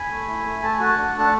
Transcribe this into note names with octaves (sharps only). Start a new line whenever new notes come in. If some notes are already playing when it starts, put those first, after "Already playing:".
Already playing: G#5 B5
A3
E4
A3
A3 A5
G#5
F#4 F#5 A5
D4
A3
F#5